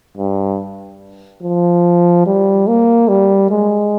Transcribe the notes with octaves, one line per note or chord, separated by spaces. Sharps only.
G2
F3
G3
A#3
G3
G#3